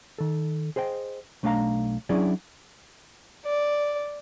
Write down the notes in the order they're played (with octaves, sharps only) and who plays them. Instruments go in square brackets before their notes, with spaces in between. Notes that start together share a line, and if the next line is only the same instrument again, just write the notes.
[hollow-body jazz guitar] D#3 A4
G#4 C5 D#5 G5
B1 A3 D4 D#5 F5 A#5
F#3 C#4 D4 E4 G#4 D5
[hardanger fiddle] D5